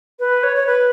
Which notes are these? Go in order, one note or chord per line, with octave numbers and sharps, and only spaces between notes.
B4
C#5
C#5
B4